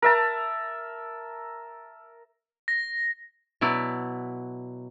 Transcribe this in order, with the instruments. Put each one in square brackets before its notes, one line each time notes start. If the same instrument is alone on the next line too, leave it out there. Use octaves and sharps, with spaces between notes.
[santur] A#4 E5 A5
[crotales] A#6
[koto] B2 F#3 E4 D5